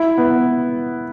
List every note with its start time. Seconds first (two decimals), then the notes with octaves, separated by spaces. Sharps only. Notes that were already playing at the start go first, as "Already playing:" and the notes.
Already playing: E4
0.18 B3